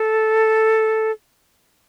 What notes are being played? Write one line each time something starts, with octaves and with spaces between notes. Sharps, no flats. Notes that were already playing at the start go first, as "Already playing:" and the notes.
Already playing: A4